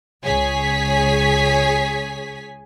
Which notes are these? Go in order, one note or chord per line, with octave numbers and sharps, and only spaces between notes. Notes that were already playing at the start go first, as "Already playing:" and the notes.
C#2 G#4 C#5 G#5 B6